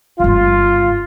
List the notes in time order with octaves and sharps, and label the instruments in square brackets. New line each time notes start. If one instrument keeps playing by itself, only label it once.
[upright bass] G1 C#3 [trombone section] F4